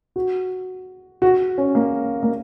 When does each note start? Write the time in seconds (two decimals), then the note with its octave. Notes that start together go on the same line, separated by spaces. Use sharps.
0.16 F#4
1.22 F#4
1.58 C#4
1.75 A#3
2.23 A#3